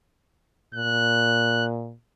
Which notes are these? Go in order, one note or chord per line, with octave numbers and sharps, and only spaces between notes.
A#2 F#6